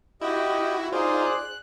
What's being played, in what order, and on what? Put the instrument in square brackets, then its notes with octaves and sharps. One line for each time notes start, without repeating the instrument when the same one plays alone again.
[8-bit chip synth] E4 F#4 [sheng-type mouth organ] G4 D#5 G5
[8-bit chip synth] D#4 F4 [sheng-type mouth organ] G#4 C5 D5
[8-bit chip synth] F#6